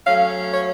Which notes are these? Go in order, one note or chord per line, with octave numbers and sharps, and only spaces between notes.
F#3 A3 C#4 F5
C#5